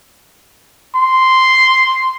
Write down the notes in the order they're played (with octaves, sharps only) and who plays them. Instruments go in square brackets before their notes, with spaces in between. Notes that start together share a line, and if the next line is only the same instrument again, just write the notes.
[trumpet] C6